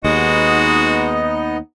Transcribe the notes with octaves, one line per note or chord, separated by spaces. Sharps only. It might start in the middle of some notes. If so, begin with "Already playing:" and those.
D#2 G#3 B3 D#4 F#4 D#5